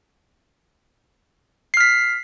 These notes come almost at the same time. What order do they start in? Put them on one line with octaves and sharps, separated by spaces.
C7 F6 B6